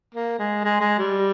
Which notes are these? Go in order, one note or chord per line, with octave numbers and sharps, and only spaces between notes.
A#3
G#3
G#3
G#3
G3